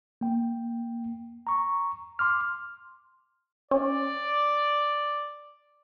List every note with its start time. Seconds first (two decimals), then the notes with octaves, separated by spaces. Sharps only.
0.21 A#3 G5
1.47 A#5 C#6
2.19 C6 D6 F6
3.71 C#4 D5